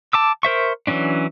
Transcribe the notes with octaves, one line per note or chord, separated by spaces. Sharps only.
A5 D6 E6
A#4 C5 E5 C#6
E3 F#3 C#4 D4